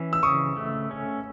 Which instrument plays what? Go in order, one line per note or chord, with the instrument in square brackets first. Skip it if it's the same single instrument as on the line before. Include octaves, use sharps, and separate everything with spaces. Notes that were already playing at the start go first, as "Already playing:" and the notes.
Already playing: [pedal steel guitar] E3 C#4
[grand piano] E6
[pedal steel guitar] C#3 [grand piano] C#6 D#6
[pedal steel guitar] A3
C#4